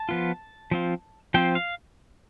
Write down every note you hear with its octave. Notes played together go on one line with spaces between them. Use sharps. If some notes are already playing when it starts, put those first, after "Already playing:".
Already playing: A5
F3 B3 F4
F3 C4 F4
F3 C4 F4 G5
F5